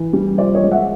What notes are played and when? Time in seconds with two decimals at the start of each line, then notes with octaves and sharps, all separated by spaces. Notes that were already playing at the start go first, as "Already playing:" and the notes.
Already playing: E3
0.13 G3
0.38 F3 C5 D5
0.55 C#5 D#5
0.63 G#3
0.71 E5 F#5